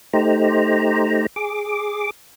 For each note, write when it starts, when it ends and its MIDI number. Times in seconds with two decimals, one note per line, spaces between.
0.13 1.26 57
0.13 1.26 63
0.13 1.26 67
0.13 1.26 72
0.13 1.26 82
1.36 2.10 68
1.36 2.10 86